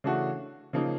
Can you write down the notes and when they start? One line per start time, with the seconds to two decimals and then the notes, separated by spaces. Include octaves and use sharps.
0.04 C#3 E3 A3 D4 F#4
0.73 C#3 F3 A#3 D#4